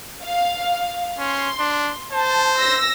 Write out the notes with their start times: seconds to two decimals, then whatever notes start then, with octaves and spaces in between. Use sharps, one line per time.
0.23 F5
1.19 C#4 C6
1.60 D4
2.12 C5 A5
2.58 E6 A#6